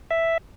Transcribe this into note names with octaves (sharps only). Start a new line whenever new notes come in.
E5